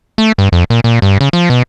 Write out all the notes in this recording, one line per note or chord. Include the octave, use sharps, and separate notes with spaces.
A3
G2
F2
A#2
A#2
G2
C#3
F3
B2